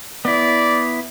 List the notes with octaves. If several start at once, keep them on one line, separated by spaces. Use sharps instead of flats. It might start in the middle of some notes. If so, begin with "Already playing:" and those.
B3 E4 D5